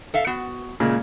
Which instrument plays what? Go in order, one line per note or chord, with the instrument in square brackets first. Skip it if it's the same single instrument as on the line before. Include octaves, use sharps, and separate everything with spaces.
[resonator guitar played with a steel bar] A4 E5 F5
B3 F#4
[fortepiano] A#2 C#3 G#3